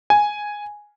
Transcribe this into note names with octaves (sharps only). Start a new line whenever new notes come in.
G#5